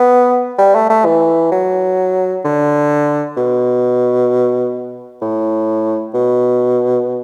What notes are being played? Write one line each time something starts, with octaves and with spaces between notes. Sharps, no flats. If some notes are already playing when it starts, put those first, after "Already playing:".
Already playing: B3
G3
A3
A3
E3
F#3
D3
B2
A2
B2